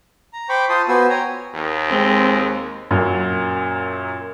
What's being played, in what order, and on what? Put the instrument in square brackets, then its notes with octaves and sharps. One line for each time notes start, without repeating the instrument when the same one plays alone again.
[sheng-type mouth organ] A#5
C5 G5 B5 C#6 D6
F4 C5 A5 C6 D#6
B3 F#4 B4 C5 G#5 E6
C#5 G5 G#5 A#5
[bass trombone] D#2
[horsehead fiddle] G#3 C4
[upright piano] F#2 A#2 F#3